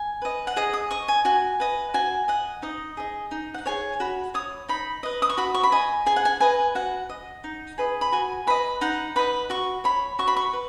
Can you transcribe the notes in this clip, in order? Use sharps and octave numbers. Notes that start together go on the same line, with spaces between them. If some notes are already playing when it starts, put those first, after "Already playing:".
Already playing: G#5
B4 D#5
F#5
G#4 D#5
D#6
D#5 C#6
G#5
F#4 G#5
B4 D#5
F#4 G#5
D#5 F#5
D#4 D#5
G#4 D#5
D#4
F#5
G#4 C#5 G#5
F#4 B5
C#5 D#6
D#4 B5
B4 D#5
D#6
C#6
F#4 B5
C#6
B5
D#5 G#5
G#4 G#5
F#5
G#5
B4 D#5 G#5
F#4 F#5
D#5
D#4
G#4 B4 D#5
B5
F#4 G#5
B4 D#5 B5
D#4 F#5
B4 D#5 B5
F#4 C#6
C#5 B5
F#4 C#6
B5
C#6
B4